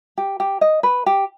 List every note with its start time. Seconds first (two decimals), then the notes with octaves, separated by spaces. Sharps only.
0.18 G4
0.40 G4
0.61 D#5
0.83 B4
1.06 G4